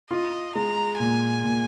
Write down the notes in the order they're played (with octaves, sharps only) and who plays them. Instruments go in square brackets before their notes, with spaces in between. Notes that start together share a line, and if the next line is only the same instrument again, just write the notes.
[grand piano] F4 [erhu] D#5
[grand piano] G#3 [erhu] A#5
[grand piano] A#2 [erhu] G#5
[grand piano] A#2